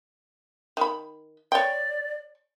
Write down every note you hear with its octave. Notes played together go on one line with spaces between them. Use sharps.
D#3 B5
C#5 D5 G5